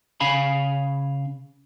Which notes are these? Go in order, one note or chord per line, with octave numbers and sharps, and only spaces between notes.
C#3 F5 G#5 B5